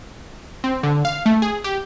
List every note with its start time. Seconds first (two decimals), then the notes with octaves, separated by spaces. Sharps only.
0.64 C4
0.83 D3
1.05 F5
1.26 A3
1.42 G#4
1.64 G4